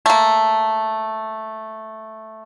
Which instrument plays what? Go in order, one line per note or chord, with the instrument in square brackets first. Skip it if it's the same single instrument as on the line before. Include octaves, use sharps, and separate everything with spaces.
[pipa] A3 A#3